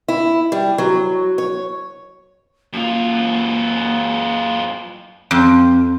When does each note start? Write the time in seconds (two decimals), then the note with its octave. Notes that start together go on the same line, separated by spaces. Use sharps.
0.08 E4
0.52 G3
0.78 F#3
1.38 C#5
2.73 F#2 A#3 F4
5.31 F2